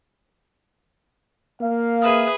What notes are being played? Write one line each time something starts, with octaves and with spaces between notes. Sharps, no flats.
A#3 F5
G#4 B4 E5 D#6